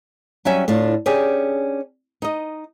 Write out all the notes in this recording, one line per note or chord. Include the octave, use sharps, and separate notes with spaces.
F#3 G3 C#4 E5 G#5
A2 D4 F4
C#4 D4 G4 G#4
D#4 D#5